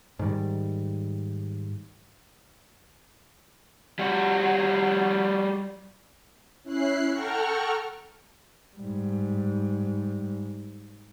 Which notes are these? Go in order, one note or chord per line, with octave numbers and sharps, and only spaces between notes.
G#2 D#3 G3
G3 F#4
C#4 E4 F#6 C7
A4 F#5 G5 A#5 C#6 F6
G#2 G3